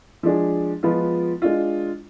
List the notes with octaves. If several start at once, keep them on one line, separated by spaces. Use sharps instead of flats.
F3 G#3 D4 G#4
F3 G#3 B3 F4
G#3 D4 F4